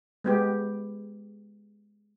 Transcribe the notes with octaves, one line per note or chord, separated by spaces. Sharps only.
G#3 B3 G4